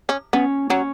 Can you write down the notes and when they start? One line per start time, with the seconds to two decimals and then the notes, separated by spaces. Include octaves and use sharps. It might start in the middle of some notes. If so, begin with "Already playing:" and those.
0.09 C#4
0.33 B3 C#4
0.70 F#3 C#4